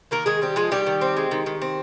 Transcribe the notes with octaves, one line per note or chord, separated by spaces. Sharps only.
D#3 A#3 A#4
D#3 G#3 G#4
G3 C4 G4
F3 G#3 F4
D#3 G3 G4
D#3
C4
G#3
D#3
D#3
C4